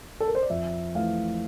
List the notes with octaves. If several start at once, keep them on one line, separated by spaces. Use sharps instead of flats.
A4
A#4
C5
D5
F2 E5
E3 A3 F5